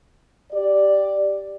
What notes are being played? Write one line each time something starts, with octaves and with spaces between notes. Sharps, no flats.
G4 D5